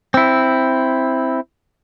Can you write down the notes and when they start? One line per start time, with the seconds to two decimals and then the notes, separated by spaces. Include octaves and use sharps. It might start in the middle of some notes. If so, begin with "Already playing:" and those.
0.14 C4 E4